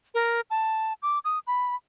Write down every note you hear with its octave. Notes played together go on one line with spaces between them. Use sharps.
A#4
A5
D6
D#6
B5